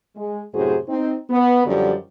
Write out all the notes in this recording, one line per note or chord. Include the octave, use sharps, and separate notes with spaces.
G#3
F#2 A2 C3 F#4 G#4 C5
C4 D#4
B3
F#2 D3 F3 G3 G4 D5